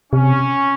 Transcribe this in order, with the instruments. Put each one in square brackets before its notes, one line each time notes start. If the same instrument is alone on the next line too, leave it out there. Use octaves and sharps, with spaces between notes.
[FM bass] C3 [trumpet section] C#4